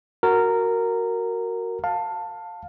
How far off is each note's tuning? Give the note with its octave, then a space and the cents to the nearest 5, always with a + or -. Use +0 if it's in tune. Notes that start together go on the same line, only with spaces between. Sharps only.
F#4 +0 A#4 -10
F5 +15 A5 +15